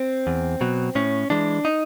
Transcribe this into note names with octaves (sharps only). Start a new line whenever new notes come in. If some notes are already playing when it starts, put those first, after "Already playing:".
Already playing: C4
E2
B2 F#3
A2 C#4
E3 G#3 D4
D#4